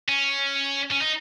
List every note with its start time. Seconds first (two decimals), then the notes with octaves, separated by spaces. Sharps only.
0.09 C#4
0.92 C#4
1.02 D#4